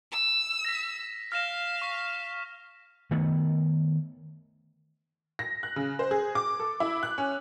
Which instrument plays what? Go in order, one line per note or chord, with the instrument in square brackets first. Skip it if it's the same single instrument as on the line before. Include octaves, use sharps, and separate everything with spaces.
[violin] E6
[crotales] A#6 B6
[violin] F5 [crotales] F6 A#6 E7
[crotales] C#6 B6
[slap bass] D#3 A3 B3
[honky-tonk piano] A#6
F#6
C#3
C5
G#4
D6
A4
E4
F#6
C#4